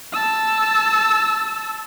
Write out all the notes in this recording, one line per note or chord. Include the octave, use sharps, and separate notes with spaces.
A5 E6